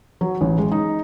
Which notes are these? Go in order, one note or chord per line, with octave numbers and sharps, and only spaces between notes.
F#3
A1
G#3
D#4